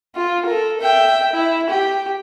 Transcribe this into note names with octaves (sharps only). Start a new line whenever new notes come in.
F4
A4 A#4
E5 G5
E4
G4